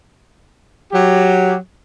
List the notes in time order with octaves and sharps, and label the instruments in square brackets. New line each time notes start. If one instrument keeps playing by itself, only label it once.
[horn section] F#3 G4